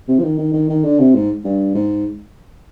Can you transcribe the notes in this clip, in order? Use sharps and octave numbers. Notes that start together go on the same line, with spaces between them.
C3
F3
D#3
D#3
D#3
D#3
D3
C3
G#2
G2
G#2